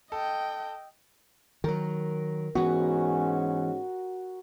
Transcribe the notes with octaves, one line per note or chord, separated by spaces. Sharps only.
A4 D#5 G5
D#3 F#3 A#4
G#2 E3 B3 C#4 F#4